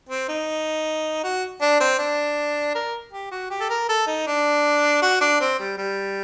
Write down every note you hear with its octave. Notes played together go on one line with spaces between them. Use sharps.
C4
D#4
F#4
D4
C4
D4
A#4
G4
F#4
G4
A4
A#4
A4
D#4
D4
F#4
D4
C4
G3
G3